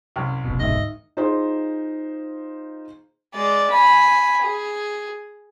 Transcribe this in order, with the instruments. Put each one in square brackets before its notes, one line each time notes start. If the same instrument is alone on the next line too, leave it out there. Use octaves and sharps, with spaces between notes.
[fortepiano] C2 F#2
[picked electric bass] F1 B1 B2
[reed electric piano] D2 G#2 E5 [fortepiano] D#3 [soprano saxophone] D#5
[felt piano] D#4 F4 G#4 C5
[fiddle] G#3 D5
G#5 B5
G#4